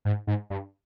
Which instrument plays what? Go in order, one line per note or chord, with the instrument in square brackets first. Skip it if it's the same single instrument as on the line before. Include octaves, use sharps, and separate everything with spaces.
[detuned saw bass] G#2
G#2
G2